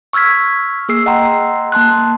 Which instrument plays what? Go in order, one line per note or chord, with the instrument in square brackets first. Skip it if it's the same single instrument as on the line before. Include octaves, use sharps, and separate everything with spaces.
[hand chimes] C#6 E6 F6 G#6 B6
A#3 G#4 E6 C7
D#5 F#5 G5 A#5 C6
A#3 A5 C6 F#6